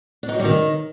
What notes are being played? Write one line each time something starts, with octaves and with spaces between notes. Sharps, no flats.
D4
D#4
F#3
G3
D#3